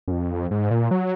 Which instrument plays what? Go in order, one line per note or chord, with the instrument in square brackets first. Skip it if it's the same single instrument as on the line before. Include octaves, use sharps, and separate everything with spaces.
[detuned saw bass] F#2
F2
G#2
A#2
F#3